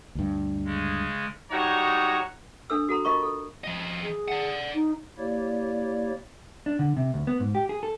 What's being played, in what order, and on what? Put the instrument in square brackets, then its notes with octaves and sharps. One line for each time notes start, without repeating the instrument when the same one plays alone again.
[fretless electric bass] D2 G2
[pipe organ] C#3 G#3
[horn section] G3 G#3 D#4 F#4 C#5 A#5
[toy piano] D4 A4 E6
F#4 A4 A#5 C6
F4 A#4 D#5 A#5 C#6
A4
[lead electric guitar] F3 D#5
[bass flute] G#4
[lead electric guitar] D5 F#5
[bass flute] D#4
[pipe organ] A#3 E4 G4 C#5 D5
[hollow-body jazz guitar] D4
D3
C3
D2
B3
G#2
G4
G#4
A4